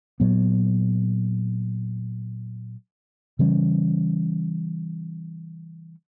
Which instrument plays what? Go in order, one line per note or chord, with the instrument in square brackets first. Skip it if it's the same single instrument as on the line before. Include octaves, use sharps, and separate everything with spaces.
[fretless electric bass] A#2 F#3 B3
C#3 E3 G3 C#4